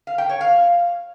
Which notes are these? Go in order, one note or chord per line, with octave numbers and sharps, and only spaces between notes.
F5
G5
C#5
F5